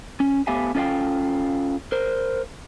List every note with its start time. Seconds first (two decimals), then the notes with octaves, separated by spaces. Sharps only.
0.20 C#4
0.47 A3 B3 G4 E5 F5 G#5
0.75 C#4 F4 A4 D#5 F5 G5
1.92 A#4 C5